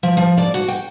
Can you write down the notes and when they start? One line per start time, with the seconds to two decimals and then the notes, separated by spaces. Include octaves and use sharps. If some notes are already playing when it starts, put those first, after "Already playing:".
0.03 F3
0.17 F3
0.38 D5
0.54 F#4
0.68 G5